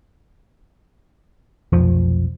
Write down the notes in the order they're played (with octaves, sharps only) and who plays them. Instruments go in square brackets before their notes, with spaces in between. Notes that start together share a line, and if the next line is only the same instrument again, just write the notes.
[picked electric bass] F1 B1 F2 F3